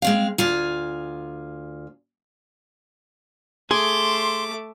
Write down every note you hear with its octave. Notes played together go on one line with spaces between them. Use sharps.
G#3 C4 F5
D2 F4 G#5
A3 G#4 C6 D6